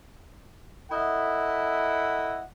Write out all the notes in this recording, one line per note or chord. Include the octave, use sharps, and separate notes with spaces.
E4 A4 D#5 E5 F#5